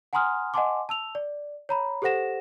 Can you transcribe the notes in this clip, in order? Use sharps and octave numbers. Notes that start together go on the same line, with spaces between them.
F#5 G#5 A#5 C6 D#6 F6
D#5 F#5 G#5 A5 C6 D6
A5 E6 F7
D5
C#5 A#5 B5
G4 A4 C5 F#5 A#6 E7